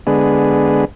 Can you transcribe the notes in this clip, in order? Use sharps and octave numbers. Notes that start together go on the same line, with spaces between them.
D3 G#3 B3